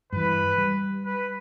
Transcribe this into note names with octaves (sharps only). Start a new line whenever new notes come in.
G2 E3 B4
G3
B4